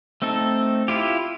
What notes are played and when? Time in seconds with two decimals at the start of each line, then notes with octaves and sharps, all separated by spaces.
0.22 A3 C4 D#4 A4
0.88 E4 F4 G4